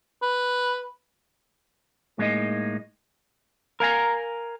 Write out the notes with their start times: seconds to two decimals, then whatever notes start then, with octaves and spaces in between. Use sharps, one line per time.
0.22 B4
2.18 A2 G#3 A#3 D#4 D#5
3.80 A#4 F5 G#5 A#5